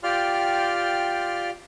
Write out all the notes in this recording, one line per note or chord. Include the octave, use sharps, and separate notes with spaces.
F4 G4 D5 G5 C6 F6